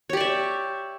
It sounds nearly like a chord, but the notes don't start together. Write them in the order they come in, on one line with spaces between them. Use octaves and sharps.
C#5 G4 D5 E5